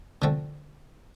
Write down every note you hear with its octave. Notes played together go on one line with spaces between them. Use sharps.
D3 F3 A3 C4